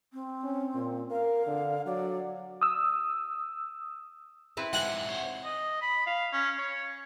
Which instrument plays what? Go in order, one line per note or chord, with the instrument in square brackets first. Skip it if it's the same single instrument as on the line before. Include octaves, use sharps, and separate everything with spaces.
[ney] C4
[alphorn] C#4
A#2
[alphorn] A#4 [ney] F5
[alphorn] D3
[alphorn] F#3 [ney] D5
[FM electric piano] D#6 E6
[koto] C4 E4 B4
[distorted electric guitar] G#2 C3 [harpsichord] F#5 G#5
[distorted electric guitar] C5 C#5
[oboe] D#5
B5
F5
C#4
C#5